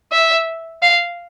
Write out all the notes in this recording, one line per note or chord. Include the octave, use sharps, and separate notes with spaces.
E5
F5